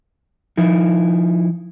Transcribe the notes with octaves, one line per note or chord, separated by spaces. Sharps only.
F3 D#4 E4